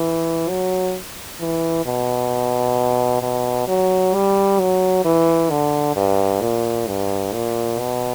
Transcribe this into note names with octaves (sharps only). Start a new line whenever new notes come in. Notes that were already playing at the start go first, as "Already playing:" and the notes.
Already playing: E3
F#3
E3
B2
B2
F#3
G3
F#3
E3
D3
G2
A#2
G2
A#2
B2